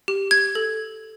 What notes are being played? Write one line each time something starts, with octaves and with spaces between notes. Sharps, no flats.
G4
G#6
A4